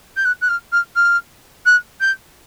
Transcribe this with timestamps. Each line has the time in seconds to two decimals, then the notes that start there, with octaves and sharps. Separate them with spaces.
0.16 G6
0.25 F#6
0.41 F#6
0.48 F6
0.72 F6
0.96 F6
1.66 F#6
2.00 G6